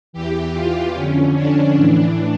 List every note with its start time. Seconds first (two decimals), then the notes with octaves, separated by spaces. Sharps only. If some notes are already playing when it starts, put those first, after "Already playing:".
0.13 E2 E3 G4
0.53 F4
0.94 F2 D3 C#4
1.35 D4
1.75 A2 E3